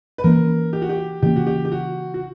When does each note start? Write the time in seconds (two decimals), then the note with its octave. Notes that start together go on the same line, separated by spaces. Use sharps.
0.18 B4
0.24 E3 A#3 C#4 A#4
0.73 G4
0.82 F#4
0.89 G4
1.23 C#3 E3 A#3 C#4 G4
1.36 F#4
1.47 G4
1.65 G4
1.72 F#4
2.14 F#4